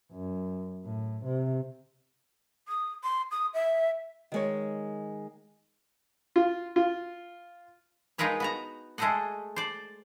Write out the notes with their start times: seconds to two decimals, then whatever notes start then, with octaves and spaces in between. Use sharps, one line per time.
0.12 F#2
0.85 A2
1.25 C3
2.68 D#6
3.04 C6
3.31 D#6
3.54 E5
4.32 D#3 G#3 C#5
6.36 F4
6.76 F4
8.18 G#3 D#4 F4 A#4 B4 C#5
8.40 B3 F#4 A#5
8.98 G#3 A3 A4 C5 D#5 F#5
9.56 C5 D5